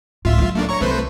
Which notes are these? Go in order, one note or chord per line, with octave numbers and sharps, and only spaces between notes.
C#2 A2 F4 E5
F3 F#3
A3 A#3 D4
C#5 A#5 C#6
C2 A3 B4 C5